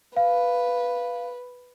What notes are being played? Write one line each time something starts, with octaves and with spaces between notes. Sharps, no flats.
B4 F5